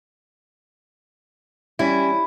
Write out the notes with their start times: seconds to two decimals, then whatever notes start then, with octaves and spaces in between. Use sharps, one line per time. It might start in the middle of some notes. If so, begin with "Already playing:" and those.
1.79 E3 G3 C#4 E4